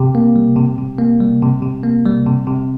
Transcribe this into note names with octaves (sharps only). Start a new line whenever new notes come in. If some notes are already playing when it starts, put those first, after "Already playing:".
Already playing: C3 G4
A#3
G3
C3
C3
A#3
G3
C3
C3
A#3
G3
C3
C3